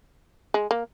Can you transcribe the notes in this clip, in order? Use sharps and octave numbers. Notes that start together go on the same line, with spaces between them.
G#3
A#3